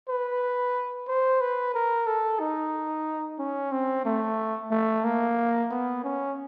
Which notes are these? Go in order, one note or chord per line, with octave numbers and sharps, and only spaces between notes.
B4
C5
B4
A#4
A4
D#4
C#4
C4
A3
A3
A#3
B3
C#4